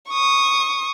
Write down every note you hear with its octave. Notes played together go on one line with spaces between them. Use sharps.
C#6 D#6